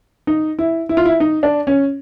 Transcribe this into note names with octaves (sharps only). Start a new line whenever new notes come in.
D#4
E4
E4
F4
E4
D#4
D4
C#4